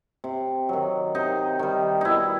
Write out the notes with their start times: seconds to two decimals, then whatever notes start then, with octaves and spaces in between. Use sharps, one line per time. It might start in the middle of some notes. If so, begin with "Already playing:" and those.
0.24 C3
0.69 D#3 F#3
1.15 C3 D#4
1.59 D#3 G3
2.01 B2 D#4 E4